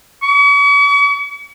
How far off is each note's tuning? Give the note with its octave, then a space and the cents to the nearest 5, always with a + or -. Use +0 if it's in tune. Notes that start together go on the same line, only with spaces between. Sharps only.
C#6 +45